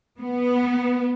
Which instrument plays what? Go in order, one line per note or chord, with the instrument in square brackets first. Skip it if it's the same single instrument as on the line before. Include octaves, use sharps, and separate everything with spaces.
[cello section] B3